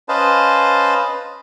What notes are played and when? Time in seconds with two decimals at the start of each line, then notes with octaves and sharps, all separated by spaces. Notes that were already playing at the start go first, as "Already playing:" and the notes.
0.09 C#4 B4 C5 D#5 F5 A5